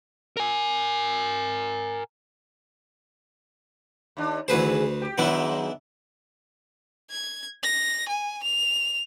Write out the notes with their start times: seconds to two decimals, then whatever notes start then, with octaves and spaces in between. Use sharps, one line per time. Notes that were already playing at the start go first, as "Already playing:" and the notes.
0.37 A#4 G#5
4.17 D#2 D4
4.48 D2 D#3 G#4 B4 C5
5.02 G4
5.18 G#2 D#3 F#3 B3 D4 E4
7.10 G#6
7.63 A#6
8.08 G#5
8.43 F7